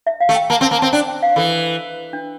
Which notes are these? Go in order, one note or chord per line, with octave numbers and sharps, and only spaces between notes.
E5
F5
A3
G5
A#3 A5
C4
A5
A#3
C4 A5
D4 G5
G5
F5
E3 A4
D4